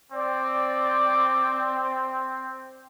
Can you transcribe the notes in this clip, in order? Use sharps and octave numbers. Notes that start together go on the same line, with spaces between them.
C4 D5